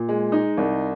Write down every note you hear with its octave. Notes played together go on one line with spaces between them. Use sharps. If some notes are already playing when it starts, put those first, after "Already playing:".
Already playing: A#2
G#3
D#4
C2